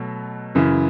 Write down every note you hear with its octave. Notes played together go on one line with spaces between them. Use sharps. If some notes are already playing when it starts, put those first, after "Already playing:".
Already playing: B2 F#3 A3
F#2 C#3 E3